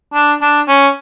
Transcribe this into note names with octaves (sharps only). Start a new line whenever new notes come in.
D4
D4
C#4